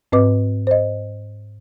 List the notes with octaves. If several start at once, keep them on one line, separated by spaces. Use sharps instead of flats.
G#2 C4 B4 D#5 D6
C5 D#5